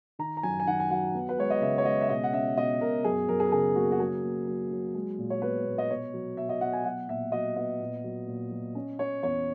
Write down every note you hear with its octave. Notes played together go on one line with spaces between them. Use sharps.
D#3 A#5
A#5
F#2 G#5
G#5
D#3 F#5
G#5
F#3 F#5
B3
B4
G#3 C#5
D#5
C#3 E5
C#5
G#3 D#5
E5
B2 D#5
F#5
C#4 E5
B2 D#5
B2 A#4
F#2 G#4
F#2 A#4
G#4
A#4
C#3 G#4
A#3 F#4
F#4
F#3 G#4
A#3
F#3
F#3
G#3
A#2
C#5
B3 B4
A#2
D#5
B2 C#5
F#3
B2 E5
D#5
B2 F#5
G#5
F#3 F#5
A#2 E5
F#3 D#5
B3 D#5
A#2
F#3
A#2
F#3
C#4
C#4 C#5
E2 C#5